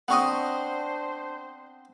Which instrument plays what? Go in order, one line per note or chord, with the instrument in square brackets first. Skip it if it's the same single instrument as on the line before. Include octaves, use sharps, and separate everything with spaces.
[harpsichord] B3 C4 D#5 [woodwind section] D4 C5 [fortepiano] F#5 C#6 D#6